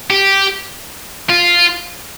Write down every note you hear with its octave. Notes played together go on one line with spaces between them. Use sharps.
G4
F4